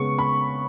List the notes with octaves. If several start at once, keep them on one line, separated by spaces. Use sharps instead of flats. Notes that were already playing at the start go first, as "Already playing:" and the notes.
Already playing: C#3 G#3 B3 C#6
B5